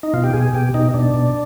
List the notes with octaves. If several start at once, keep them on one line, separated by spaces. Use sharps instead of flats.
D#4
B2 F4
G4
B2 G#4
B2 G4
B2 D#4
B2 D4
B2